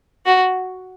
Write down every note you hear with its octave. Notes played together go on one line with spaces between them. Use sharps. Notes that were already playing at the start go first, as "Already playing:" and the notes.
F#4